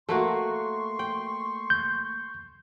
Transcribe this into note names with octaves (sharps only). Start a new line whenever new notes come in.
A3 A#3 F#4 C6 C#6
G5
G6